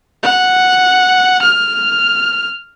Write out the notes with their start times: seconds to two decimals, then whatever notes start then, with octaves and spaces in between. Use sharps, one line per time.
0.23 F#5
1.42 F6